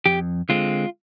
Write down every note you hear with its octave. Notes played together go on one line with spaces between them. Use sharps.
F2 G4
D3 G#3 C4 F4